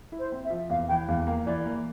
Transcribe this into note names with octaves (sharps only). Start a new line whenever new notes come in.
E4
C5
C4
E5
F3
E2 F5
E3 G5
E2 F5
A#3 F5
E3 D5
A#3